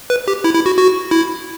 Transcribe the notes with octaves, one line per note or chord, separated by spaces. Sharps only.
B4
G4
E4
E4
F#4
F#4
E4